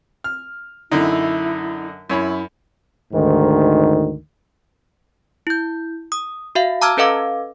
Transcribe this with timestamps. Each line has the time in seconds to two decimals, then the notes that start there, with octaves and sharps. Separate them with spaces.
0.24 F6
0.91 F#2 D3 D#4 E4
2.10 F#2 E4 C#5 B5
3.13 D2 G#2 D#3
5.47 E4 G6
6.12 D#6
6.55 F#4 E5 F5
6.81 A5 A#5 D6 E6 F6 G#6
6.97 C#4 A4 B4 D#5 F5 D6